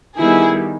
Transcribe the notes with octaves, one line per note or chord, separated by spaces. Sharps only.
D#3 G3 B3 E4 G#4